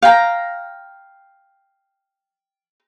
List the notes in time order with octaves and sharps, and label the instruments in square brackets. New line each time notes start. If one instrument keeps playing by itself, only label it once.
[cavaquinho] F5 G5 A#5